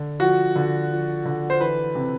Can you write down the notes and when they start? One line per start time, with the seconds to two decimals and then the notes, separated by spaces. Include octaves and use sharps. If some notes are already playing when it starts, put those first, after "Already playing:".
Already playing: D3
0.20 F3 F#4
0.56 D3
0.90 F3
1.25 D3
1.50 C5
1.60 E3 B4
1.95 C3